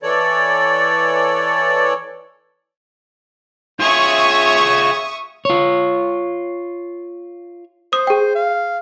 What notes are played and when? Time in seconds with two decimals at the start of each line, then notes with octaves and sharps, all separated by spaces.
0.03 E3 A4 C#5 D5
3.80 F4 G#4 C#5 E5 C#6 D#6
5.45 F4 C#5
7.93 C5 D#6
8.07 G#4 G5
8.35 F5